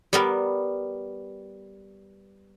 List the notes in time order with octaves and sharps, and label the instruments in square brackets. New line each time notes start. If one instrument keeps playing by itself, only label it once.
[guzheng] G3 B3 A#4